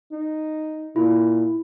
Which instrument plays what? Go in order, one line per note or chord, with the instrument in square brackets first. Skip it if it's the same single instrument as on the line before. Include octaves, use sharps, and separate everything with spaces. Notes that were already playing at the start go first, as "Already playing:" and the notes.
[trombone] D#4
[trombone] A#2 [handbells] E4